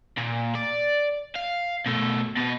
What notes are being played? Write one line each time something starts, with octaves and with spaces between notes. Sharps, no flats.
A#2
D5
F5
B2 A3
B2 B3